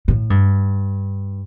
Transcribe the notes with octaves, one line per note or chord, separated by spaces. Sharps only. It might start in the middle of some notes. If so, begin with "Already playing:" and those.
A2
G2